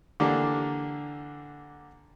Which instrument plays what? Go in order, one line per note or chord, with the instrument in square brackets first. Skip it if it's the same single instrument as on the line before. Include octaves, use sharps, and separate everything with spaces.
[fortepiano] D3 E3 A#3 D4 G4